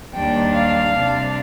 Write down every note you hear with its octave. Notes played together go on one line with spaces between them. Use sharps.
D#2 D#3 G3 D4 G5
F5
C3 G3 D4